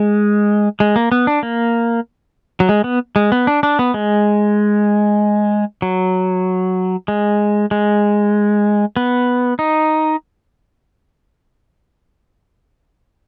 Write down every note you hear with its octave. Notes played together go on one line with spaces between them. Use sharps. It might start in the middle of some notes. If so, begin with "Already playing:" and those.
Already playing: G#3
G#3
A#3
B3
D4
A#3
F#3
G#3
B3
G#3
B3
D4
D4
B3
G#3
F#3
G#3
G#3
B3
D#4